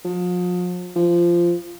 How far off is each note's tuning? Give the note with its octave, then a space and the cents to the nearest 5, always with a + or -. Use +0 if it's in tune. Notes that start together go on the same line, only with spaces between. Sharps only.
F3 +40
F3 -15